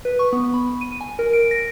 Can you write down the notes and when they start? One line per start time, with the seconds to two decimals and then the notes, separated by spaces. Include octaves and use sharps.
0.05 B4
0.19 C#6
0.33 B3
0.54 B5
0.81 D#7
1.01 G#5
1.19 A#4
1.33 D7
1.51 A#6